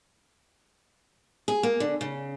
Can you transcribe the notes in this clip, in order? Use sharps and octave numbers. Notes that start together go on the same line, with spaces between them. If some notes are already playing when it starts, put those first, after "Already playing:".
G#4
A#3
D3
C#3